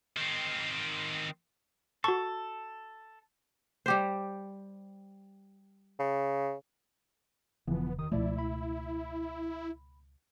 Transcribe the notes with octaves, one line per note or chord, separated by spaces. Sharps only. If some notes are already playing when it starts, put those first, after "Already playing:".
D#3 C4
F#4 A4 C#6
G3 G4 C5
C#3
E1 C#3 E3 F3 B3
D#2 D#3 D#6
C#2 B2 F3 A3 E4 D5
B5